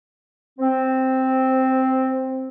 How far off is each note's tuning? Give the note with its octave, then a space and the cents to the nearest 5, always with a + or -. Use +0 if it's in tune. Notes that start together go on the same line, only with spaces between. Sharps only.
C4 +0